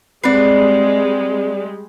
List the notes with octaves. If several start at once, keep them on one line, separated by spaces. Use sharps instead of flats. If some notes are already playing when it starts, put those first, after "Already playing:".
G3 G#3 C4 D4 B4 C7